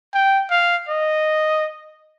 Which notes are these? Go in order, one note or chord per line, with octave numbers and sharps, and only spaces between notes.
G5
F5
D#5